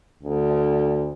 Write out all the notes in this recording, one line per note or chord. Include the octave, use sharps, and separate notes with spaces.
D2